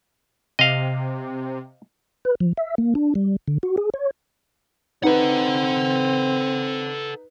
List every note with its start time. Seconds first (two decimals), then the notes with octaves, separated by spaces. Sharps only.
0.59 C3 D#5 F5
2.25 B4
2.40 F3
2.57 E5
2.78 A#3
2.95 D4
3.15 G3
3.48 D3
3.63 F#4
3.78 G#4
3.94 C#5
5.04 C4 D#4 A4 B4 F#5